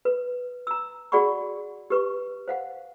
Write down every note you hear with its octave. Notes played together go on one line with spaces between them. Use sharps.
B4
A#5 E6
F#4 G#4 D5 F#5 B5 C#6
G4 B4 C#6
C5 F5 F#5